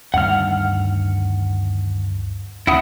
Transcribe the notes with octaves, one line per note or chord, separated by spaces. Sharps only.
D2 G2 D#3 F#5 F6
D2 E3 E4 F#5 D#6